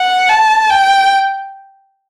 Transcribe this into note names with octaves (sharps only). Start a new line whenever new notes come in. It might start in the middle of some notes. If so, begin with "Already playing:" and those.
Already playing: F#5
A5
G5